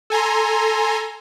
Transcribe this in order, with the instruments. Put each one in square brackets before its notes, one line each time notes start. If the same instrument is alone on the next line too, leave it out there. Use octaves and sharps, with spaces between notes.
[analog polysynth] A4 G#5 A#5 C6